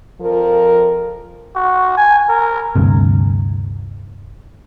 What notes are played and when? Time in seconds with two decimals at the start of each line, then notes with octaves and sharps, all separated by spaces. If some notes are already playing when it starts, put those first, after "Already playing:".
0.21 F2 F3 A#4
1.55 F#4
1.97 G#5
2.29 A#4
2.76 D2 G2 C3